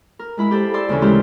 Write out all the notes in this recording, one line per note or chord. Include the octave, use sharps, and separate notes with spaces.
A#4
G#3 E4 B5
G4 A4 C5
A4 D5 C6 E6
D2 C#3 E3 C#4
G#3 E4 G4 A#4 C5